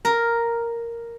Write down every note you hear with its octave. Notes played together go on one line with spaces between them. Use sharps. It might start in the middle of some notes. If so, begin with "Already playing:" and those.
A#4